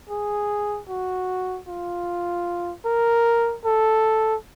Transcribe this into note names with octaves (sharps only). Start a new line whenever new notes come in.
G#4
F#4
F4
A#4
A4